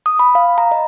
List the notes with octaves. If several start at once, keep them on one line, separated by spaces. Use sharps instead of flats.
D#6
B5
F5
A#5
D#5